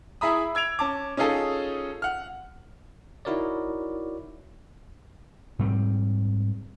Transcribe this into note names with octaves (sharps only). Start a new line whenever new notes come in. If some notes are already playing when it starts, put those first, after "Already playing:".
E4 G#4 E5 A#5 B5 D#6
E6 G#6 D7 F7
C#4 A5 D6
C#4 D#4 F4 G#4 A4
F#5 F6
D#4 E4 F#4 A#4 C#5 D5
G#2 G3 C4